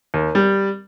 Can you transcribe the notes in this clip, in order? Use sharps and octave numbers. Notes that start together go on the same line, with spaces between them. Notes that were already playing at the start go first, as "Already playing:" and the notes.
D#2
G3